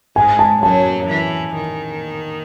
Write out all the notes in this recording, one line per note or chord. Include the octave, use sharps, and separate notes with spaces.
G#2 G#3 G#5
A5
F#2 F#3 A5
E3
D#3